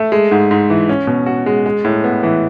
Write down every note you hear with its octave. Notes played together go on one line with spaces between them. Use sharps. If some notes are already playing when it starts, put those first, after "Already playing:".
Already playing: A3
G#3
G#2
G#2
E3
C#4
B2
F#4
G#3
G#3
A2
B3
E3